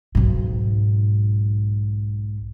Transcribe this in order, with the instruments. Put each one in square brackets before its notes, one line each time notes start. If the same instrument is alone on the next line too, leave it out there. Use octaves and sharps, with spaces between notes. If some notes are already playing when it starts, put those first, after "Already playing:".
[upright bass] B1 G#2